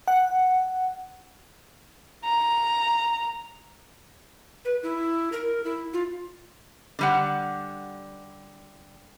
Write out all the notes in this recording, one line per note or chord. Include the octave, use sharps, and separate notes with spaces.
F#5
A#5
B4
E4
A#4
E4
F4
D3 G3 F#5